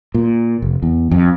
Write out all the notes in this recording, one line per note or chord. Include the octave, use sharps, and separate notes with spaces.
A#2
F1
E2
F2